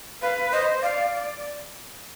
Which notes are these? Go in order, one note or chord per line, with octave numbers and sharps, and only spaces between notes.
B4 F5
C5 D#5
D5 F5